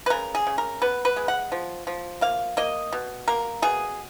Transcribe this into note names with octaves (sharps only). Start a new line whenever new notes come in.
B4
C#3 A#4
G#4
C#3
A#4
B3 B4
B4
G#3
F#5
F3
F3
A#3 F5
A#3 D#5
B2
A#3 A#4
B2 G#4